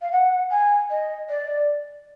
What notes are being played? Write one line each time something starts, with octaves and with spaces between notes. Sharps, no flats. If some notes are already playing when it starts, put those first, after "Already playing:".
F5
F#5
G#5
D#5
D5